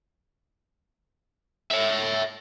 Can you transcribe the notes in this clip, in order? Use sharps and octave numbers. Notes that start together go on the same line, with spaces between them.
C#5 E5